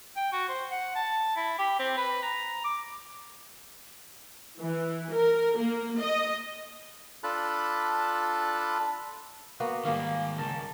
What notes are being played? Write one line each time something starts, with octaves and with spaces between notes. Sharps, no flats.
G5
F#4
C5
F#5
A5
E4
G4
C4
B4
A#5
D6
E3
A#4
A#3
D#5
D4 F4 A4 A5 B5 F#6
A#3 B3 F#4
G#2 D#3 G3 A#3 A#4 F5
C#2 A#4 A5